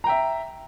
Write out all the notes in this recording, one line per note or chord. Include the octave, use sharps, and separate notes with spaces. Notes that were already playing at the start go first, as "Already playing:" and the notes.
E5 G5 A#5